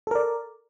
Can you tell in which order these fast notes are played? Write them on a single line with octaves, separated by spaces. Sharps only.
A4 A#4 D5